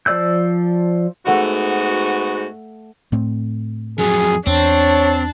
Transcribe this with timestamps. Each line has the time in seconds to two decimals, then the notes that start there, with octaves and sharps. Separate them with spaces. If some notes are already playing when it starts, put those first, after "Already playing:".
0.06 F3 C5 D5 E6 G6
1.25 G#2 A3 B3 F#4 F#5 C#7
3.12 A2 A3 C4
3.99 F2 F#3 G#4
4.47 E2 C4 D4 C#5 A5